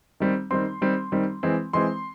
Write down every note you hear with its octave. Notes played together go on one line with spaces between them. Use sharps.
D#3 G3 C4
D#3 G3 C4 C6
D#3 G3 C4
D#3 G3 C4
E3 G#3 C4
E3 G#3 C4 C6